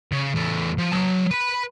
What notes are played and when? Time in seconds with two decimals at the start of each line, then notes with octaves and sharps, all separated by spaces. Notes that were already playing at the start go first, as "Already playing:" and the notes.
0.12 C#3
0.35 E2 A3
0.78 F3
0.92 F#3 A5
1.31 B4 B5